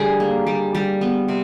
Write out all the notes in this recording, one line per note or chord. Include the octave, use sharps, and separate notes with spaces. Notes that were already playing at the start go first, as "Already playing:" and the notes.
Already playing: D3 G3 G#4
A#3
G3
G3
B3
C3